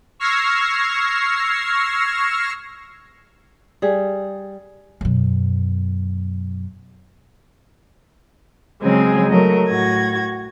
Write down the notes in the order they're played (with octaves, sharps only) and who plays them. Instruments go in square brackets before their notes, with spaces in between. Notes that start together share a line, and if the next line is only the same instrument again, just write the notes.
[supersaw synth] C#6 E6 F6 G#6 A#6 C7
[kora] G3 G#4
[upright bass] F#2 B2
[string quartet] C#3 F#3 G#3 C4 G#4
F#3 A3 A#4 D#5
A2 F#4 G#6 A#6